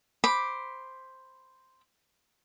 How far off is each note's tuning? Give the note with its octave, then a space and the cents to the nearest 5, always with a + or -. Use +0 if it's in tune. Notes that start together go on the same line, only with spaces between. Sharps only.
C5 +0 B5 +0 D6 +5